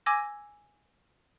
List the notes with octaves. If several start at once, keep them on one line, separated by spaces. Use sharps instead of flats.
G#5 D6 E6 G#6 A#6